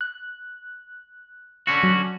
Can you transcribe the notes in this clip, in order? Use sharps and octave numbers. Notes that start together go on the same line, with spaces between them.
F#6
D3 C#4 F#4
F#3